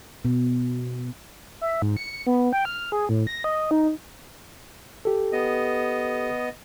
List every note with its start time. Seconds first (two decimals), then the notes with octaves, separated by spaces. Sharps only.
0.25 B2
1.61 E5
1.82 G#2
1.97 C#7
2.27 B3
2.53 G5
2.65 F6
2.92 G#4
3.09 A2
3.27 A#6
3.44 D#5
3.71 D#4
5.05 G4 A4
5.33 B3 D#5